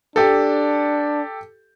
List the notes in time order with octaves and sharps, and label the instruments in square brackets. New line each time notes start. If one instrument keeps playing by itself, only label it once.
[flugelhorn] D4 [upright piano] G4 A4